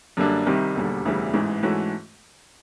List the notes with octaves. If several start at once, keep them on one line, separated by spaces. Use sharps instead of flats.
F#2 D3 G3 A#3 D4
C2 C3 D#3 G3
E1 D#2 D3 G3
E1 D2 C#3 E3 G3
A1 G#2 E3
G#2 E3 A3 C#4 F#4